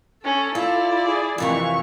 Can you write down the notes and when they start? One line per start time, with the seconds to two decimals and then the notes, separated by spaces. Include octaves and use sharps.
0.24 C#4 A4
0.55 E4 F4 D5
1.05 G#4
1.38 F2 C3 E3 A#3 C#6